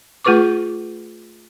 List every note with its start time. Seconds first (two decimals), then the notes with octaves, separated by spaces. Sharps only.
0.25 A3 F4 G#4 B4 C#6 D6